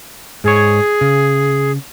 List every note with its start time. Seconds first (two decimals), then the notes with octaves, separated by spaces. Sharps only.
0.44 G#2 G#4 C#5
1.01 C#3